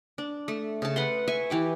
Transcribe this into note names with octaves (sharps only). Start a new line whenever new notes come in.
D4
A3
C#3 A5
B4 F#5 C6
E5 G#5 C#6
E3 G4 D6